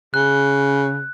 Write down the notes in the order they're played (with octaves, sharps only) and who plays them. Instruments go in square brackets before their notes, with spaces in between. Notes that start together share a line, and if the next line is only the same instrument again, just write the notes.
[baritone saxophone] C#3 [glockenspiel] F#6